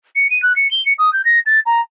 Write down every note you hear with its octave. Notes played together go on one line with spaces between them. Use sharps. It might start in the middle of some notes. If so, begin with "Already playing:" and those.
C#7
D#7
F#6
C#7
G7
C#7
D#6
G6
A#6
A6
A#5